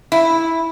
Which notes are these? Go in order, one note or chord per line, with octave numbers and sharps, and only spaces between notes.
E4